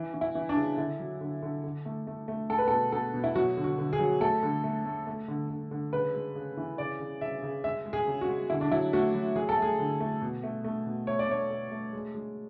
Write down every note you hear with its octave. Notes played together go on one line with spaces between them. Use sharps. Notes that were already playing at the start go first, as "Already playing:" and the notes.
Already playing: E3
E3
E4
E3
D4
C#3
D3 E4
F#3
D3
D3
D3
A3
A3
A3
G#3 A4
B4
A4
B2
B2 A4
B2
E4
F#3 F#4
D3
F#4
D3
G#4
F#3
A3 A4
D3
A3
A3
A3
D3
D3
D3
C#3 B4
G#3
C#3
E3
C#3 D5
C#3
C#3 E5
C#3
G#3 E5
G#3
G#4
C#3
F#4
G#3
D3 E4
D4
F#3 E4
A3 F#4
F#3
F#3 G#4
A4
A3
G#4
D3
A3
B2
A3
A3
B2
A3 C#5
D5
A3 C#5
A3
A3
G#3
G#3